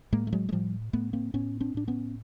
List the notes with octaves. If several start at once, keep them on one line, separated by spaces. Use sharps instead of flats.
A2 G#3 A#3
A3
F#3 G#3
G#3
A2 F3 G3
A2 A3 B3
A#3 C4
A2 B3 C#4
C4 D4
A2 D4
B3 C#4